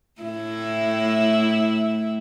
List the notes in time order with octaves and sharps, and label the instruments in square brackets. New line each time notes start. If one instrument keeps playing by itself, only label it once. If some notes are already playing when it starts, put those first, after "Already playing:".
[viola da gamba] A2 E4